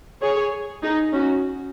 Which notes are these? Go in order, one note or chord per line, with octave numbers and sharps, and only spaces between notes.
G#4 C#5
D#4 G#4
C#4 F#4